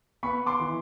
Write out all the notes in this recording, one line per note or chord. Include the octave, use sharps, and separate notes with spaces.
B3 B5 C#6
C6 D6
E3